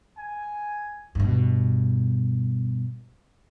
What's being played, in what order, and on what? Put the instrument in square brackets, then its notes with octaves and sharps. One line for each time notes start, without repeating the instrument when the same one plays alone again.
[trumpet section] G#5
[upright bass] G2 B2